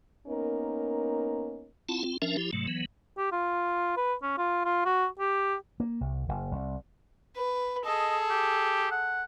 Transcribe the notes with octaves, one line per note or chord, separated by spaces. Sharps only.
A#3 B3 C#4 D#4 A#4
C4 E4 F4 F#5 A5
C4 F4
F3 C#4 D4 A#4 E5
F3 E4 G4
G#2 C3 F#3 A3
E3 F#3 B3
G4
F4
B4
C#4
F4
F4
F#4
G4
A#3
C2
F#1
C2
B4
G#4 A4 D#5
G4
F#5